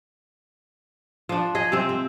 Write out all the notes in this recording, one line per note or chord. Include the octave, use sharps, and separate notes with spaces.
F3 D4
G#4 D#5
C3 G#3 C4
C4